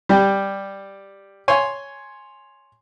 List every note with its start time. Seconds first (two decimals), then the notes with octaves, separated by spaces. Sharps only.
0.09 G3 G4
1.48 C#5 G#5 C6